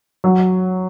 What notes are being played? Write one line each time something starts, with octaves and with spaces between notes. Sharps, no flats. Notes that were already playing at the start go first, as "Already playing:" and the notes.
F#3